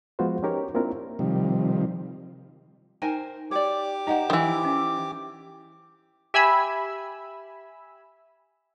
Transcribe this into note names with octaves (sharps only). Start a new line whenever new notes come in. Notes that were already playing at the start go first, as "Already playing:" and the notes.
F3 G#3 B3 F4 F#4 C5
C#4 D#4 G4 A#4 C#5
A#3 C4 D4 E4 F4 A#4
C3 D#3 F3 G3
D#4 A#4 C5 G5 G#5
G4 C#5 D5 D6
D#4 C5 D#5 F#5 A#5
D#3 E3
C#4
G4 E5 G#5 B5 E6